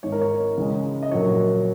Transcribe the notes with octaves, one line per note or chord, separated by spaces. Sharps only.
G#1 G#2 G#3 C#5
A#4
C#5
C#2 C#3 G#3
D#5
A#1 A#2 F#3 A#3 C#5